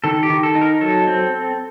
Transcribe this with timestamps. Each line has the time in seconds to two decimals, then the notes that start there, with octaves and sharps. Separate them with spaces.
0.04 D#3 A4
0.23 G4
0.30 D#3
0.43 A4
0.55 D#4
0.61 A#4
0.81 F#3 A4
1.07 C4